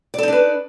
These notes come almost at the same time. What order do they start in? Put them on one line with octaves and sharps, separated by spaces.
D5 A4 D#4 D4 B4